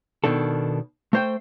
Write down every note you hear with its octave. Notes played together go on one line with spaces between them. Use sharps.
B2 D#3 D4 A4
A3 C5 G5